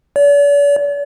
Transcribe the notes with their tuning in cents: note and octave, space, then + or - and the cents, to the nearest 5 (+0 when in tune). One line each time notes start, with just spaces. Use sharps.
D5 -45